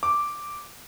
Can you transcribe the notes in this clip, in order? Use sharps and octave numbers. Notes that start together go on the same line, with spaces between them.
D6